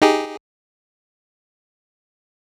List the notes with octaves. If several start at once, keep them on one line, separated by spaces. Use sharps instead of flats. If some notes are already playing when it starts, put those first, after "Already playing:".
D#4 G4 G#4